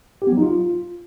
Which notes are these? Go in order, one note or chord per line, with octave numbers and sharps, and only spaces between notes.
G4
B3
F#3
D#4
F4